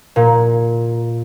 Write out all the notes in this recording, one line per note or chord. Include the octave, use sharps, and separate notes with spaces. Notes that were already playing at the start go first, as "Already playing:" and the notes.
A#2